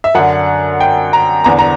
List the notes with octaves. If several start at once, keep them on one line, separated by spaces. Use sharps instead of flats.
E5
F#2 D3 F#5
G5
A#5
E2 D3 A#5
A#5